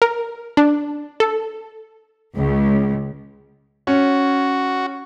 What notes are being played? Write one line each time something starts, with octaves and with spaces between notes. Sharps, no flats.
A#4
D4
A4
C#2
C#4 F#4